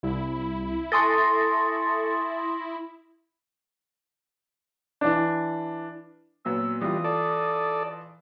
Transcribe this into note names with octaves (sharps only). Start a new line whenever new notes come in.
C2 E4
A4 G#5 C6 C#6 D#6 A6 A#6
E3 D4
A#2 F#3 B3 E6
E3 G3 F4 D#6
A4 D5